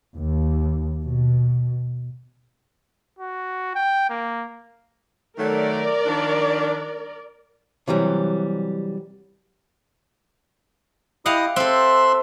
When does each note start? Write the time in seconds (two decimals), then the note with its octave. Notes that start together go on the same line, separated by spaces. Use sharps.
0.15 D#2
1.04 B2
3.19 F#4
3.75 G5
4.09 A#3
5.38 D#3 F#3 A3 A#4 D5
6.06 D#3 F3 D4
7.87 C3 E3 F#3 G3
11.26 E4 G4 D#5 F5 F#5 D#6
11.56 C4 A4 E5 C6 F#6